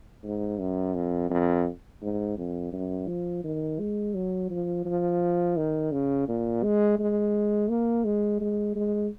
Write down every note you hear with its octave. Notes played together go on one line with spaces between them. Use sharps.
G#2
F#2
F2
F2
G#2
F2
F#2
F3
D#3
G#3
F#3
F3
F3
D#3
C#3
A#2
G#3
G#3
A#3
G#3
G#3
G#3